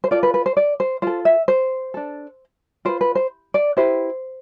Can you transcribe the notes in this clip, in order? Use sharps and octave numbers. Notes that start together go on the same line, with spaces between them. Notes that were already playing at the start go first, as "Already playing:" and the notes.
C5
F4 A4 D5
B4
B4
C5
D5
C5
F4 A4 C5
E5
C5
D4 A4
F4 B4 C5
B4
C5
D5
E4 G4 B4 C5